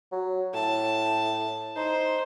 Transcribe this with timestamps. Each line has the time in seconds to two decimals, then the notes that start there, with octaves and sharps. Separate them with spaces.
0.12 F#3
0.54 A2 A5
1.76 D#4 C5